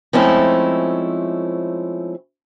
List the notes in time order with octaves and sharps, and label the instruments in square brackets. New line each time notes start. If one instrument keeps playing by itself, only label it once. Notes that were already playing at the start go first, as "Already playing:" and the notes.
[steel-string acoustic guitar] F3 G#3 A3 C4 C#4 E4